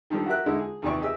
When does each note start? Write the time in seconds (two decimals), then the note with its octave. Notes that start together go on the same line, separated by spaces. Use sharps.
0.10 D#3 F3 G3 D4 A4
0.26 F#4 G4 A#4 E5 F#6
0.46 D3 G#3 D#4 E4
0.59 G#4
0.82 D#2 C3 D#3 E3 D5 C#6
1.01 G4 G#4 D#5 E5 E6